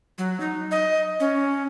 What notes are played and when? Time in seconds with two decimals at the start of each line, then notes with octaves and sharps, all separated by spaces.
0.18 F#3
0.40 D#4
0.71 D#5
1.20 C#4